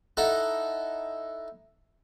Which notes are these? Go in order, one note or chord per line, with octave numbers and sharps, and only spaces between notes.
D#4 E4 A4 F#5 A#5